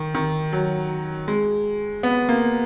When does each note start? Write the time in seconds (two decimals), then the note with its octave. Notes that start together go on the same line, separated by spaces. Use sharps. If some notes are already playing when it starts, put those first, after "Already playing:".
Already playing: D#3
0.15 D#3
0.53 F#3
1.28 G#3
2.03 B3
2.29 A#3